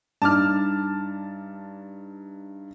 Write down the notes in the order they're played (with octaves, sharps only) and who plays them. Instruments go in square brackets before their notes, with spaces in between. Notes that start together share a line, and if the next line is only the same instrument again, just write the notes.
[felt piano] G2 D4 D#4 [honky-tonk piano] A5 D6 F6